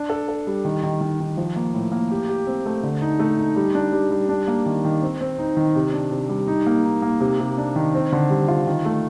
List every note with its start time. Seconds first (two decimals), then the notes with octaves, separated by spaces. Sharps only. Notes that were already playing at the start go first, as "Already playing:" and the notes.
Already playing: D4
0.10 A4
0.28 A4
0.47 G3
0.65 D#3
0.83 D#3
1.01 D#3
1.20 D#3
1.37 F3
1.56 A#3
1.74 A2
1.92 A#3
2.11 G4
2.29 G4
2.47 C4
2.66 A3
2.83 D3
3.01 D#4
3.20 A3
3.38 D#4
3.56 G3
3.75 D4
3.93 G3
4.11 G3
4.29 D4
4.48 A#3
4.66 D#3
4.85 D#3
5.02 C4
5.21 C4
5.38 D#4
5.57 D#3
5.75 C3
5.94 D4
6.11 C3
6.29 G3
6.48 D#4
6.66 A#3
6.85 D#4
7.02 A#3
7.21 C3
7.40 C3
7.58 D4
7.76 D#3
7.94 C4
8.12 D3
8.30 G3
8.48 F4
8.67 D#3
8.85 A3